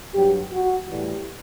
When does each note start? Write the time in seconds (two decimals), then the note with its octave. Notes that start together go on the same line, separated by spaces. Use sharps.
0.14 G2 F#3 G4
0.52 F#4
0.89 A2 E3 G3